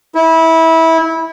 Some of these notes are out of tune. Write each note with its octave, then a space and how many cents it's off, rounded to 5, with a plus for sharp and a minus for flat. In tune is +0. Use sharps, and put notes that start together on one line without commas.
E4 -20